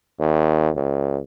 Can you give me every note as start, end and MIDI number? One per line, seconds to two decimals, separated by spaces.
0.19 0.70 39
0.75 1.20 37